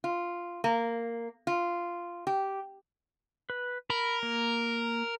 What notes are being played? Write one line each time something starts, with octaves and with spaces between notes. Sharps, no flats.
F4
A#3
F4
G4
B4
A#4 B5
A#3